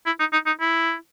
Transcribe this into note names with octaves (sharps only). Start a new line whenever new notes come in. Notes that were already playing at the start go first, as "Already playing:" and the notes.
E4
D#4
D#4
D#4
E4